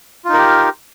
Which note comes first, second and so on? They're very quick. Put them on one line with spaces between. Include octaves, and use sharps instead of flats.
F4 D#4 A#4 G4